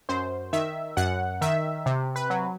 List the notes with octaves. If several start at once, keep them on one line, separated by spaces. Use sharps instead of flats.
F#2 C5
D#3 E5
F#2 F#5
D#3 E5
C3
B4
F#3